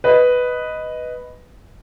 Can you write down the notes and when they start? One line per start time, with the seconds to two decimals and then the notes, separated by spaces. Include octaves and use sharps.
0.04 B4 D#5